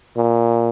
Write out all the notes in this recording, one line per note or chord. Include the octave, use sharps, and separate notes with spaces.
A#2